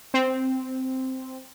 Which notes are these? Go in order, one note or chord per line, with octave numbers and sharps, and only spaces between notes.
C4